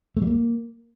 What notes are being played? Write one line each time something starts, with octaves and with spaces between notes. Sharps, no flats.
A3
G3
A#3